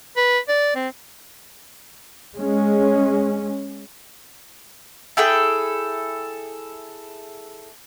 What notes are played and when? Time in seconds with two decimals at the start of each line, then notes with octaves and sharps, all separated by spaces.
0.17 B4
0.49 D5
0.75 C4
2.34 G#3 C#4
5.17 E4 G#4 A4 G5